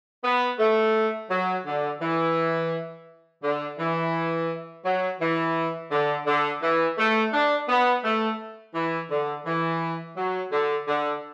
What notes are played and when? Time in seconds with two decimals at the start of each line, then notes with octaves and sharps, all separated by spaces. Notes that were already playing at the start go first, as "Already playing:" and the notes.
0.24 B3
0.60 A3
1.30 F#3
1.66 D3
2.01 E3
3.43 D3
3.79 E3
4.85 F#3
5.21 E3
5.92 D3
6.27 D3
6.62 E3
6.98 A3
7.33 D4
7.69 B3
8.04 A3
8.75 E3
9.11 D3
9.46 E3
10.17 F#3
10.52 D3
10.88 D3